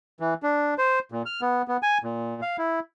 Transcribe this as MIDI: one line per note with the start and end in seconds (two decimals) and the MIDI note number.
0.20 0.34 52
0.43 0.74 62
0.78 0.99 72
1.12 1.22 46
1.26 1.41 89
1.41 1.62 59
1.68 1.77 59
1.83 1.98 80
2.04 2.41 46
2.42 2.57 77
2.58 2.80 64